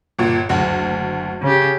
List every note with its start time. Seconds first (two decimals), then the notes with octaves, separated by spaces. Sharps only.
0.19 G1 A#2
0.49 F#1 D2
1.42 C#3 G4